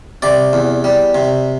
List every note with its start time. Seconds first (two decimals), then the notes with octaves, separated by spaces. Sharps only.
0.22 C3 D5
0.53 E2
0.84 G3
1.15 C3